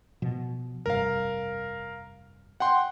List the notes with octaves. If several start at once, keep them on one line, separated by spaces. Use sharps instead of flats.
B2 F3
F1 C2 G2 A#4 F5
F#5 G5 C6